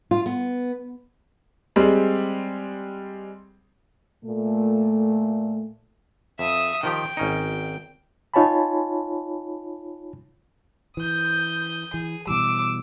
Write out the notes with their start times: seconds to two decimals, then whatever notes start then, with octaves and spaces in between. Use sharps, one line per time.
0.11 F4
0.26 B3
1.76 G3 G#3 C4
4.25 A#2 A3
6.39 F2 E5 D#6
6.83 D#3 F3 G4 G5
7.17 G#1 C#4 D#4
8.34 D#4 F4 C#5 G#5 A5 B5
10.97 E3 D#6 G6
11.94 E3 G#4
12.27 B2 E3 G3 D6 E6